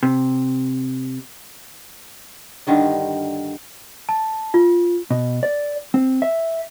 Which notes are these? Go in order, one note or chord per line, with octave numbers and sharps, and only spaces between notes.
C3
G2 D3 D#3 D#5
A5
F4
B2
D5
C4
E5